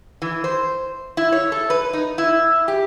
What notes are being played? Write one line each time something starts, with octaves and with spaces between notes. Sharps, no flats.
E3
C5
E4
C#5
A4
B4
D#4
E4
G4